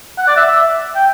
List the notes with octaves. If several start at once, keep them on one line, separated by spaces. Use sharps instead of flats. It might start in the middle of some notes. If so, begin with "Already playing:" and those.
F#5
D5
E5
E5
G5